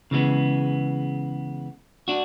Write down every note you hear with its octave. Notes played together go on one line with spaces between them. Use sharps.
C#3 E3 G#3 B3
D4 F#4